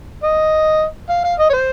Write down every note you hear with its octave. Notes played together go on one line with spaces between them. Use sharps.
D#5
F5
F5
D#5
C#5
C5